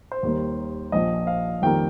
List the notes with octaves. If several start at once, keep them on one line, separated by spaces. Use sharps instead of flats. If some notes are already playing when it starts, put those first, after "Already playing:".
C5
D#2 D#3 G3 A#3
A#1 A#2 F3 D#5
F5
F2 D#3 G3 A#3 G5